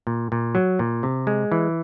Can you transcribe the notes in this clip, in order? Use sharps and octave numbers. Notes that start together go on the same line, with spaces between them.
A#2
A#2
F#3
A#2
C3
G#3
E3